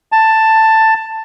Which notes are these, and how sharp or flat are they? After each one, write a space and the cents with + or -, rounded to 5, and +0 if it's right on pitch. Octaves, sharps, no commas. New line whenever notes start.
A5 +10